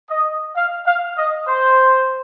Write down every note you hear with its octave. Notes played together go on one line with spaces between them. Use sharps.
D#5
F5
F5
D#5
C5